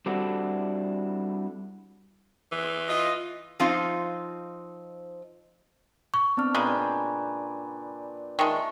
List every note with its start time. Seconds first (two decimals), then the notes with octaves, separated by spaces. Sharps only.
0.06 G3 C4 D4 E4 F#4 A4
2.52 E3
2.89 F4 D#5
3.60 F3 C4 D#4 F4
6.14 C#6
6.37 B3 C4 D4 F6
6.55 A#2 C#3 G#3 B4 G5 G#5 A#5 B5
8.39 D#3 G#3 E5 A5 C#6